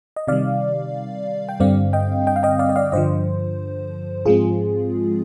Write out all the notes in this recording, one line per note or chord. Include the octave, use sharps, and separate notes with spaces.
D#5
C3 D#3 G3 D5 F5
G5
G2 D3 G3 C4 D5 F5
D#5 G5
D#5 G5
F5
D#5 G5
D5 F5
D#5
D5 F5
G2 D3 F3 C5 D#5
G#2 F3 G#3 C4 F4 G#4